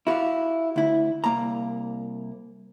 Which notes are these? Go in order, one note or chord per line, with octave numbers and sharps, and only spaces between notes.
E4 F#4 G4 F5
D2 E4
C2 A#3 A#5